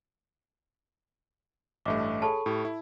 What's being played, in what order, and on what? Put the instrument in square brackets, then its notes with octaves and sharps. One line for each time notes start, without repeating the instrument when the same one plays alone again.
[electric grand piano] A1 G2 A3 [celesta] D#5 E5 D6
[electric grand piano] G#4 C#5 [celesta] A4 B5 C#6 [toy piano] A5
[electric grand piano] A2 G4
E4